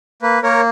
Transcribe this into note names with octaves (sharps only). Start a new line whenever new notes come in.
A#3 B4
A#3 A#4 C#5